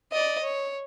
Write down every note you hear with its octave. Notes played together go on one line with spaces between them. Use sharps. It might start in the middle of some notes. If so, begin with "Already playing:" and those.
D5 D#5
C#5